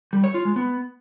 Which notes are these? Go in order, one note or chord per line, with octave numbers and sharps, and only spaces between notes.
G3
C#5
F4
G#3
B3